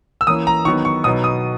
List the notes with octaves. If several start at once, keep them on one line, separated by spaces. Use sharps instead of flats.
E6
E3 A#3 C#4 D#6
A#5
D#3 F#3 B3 D#4 C#6
C#6
B2 F#3 B3 D#4 D#6
D#6